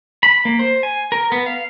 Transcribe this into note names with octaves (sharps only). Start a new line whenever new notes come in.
B5
A#3
C5
G#5
A#4
B3
F5